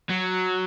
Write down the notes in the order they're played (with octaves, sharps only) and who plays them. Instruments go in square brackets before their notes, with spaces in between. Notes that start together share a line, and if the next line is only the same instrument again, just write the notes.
[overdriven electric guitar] F#3